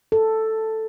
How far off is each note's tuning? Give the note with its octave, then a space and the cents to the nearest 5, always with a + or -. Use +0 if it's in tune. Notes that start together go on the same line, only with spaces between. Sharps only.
A4 +5